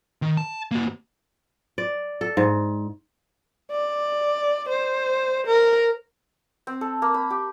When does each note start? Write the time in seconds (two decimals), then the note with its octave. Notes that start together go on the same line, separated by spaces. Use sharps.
0.22 D#3
0.37 A5
0.71 A#3 F#4
1.78 D5
2.21 A4
2.37 G#2
3.71 D5
4.69 C5
5.47 A#4
6.67 C4
6.81 A4
7.02 A#3
7.14 B5
7.30 G4